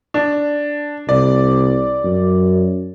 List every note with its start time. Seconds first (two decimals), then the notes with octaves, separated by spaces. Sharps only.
0.14 D4
1.09 C2 D5
2.05 F#2